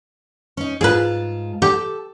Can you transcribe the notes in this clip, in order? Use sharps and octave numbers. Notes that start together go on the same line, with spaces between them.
C#4 D#4
G#2 F4 G#4 B4 A5
G4 A4